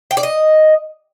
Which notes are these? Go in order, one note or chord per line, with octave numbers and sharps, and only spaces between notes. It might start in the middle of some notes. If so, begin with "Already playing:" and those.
G5
D5
D#5